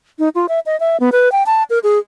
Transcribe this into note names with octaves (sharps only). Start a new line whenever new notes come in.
D#4
F4
E5
D#5
E5
B3
B4
G5
A5
A#4
G#4